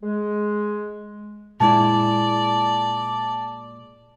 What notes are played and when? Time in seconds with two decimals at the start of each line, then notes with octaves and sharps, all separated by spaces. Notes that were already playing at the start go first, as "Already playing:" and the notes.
0.02 G#3
1.60 A#2 G#3 E4 D5 A5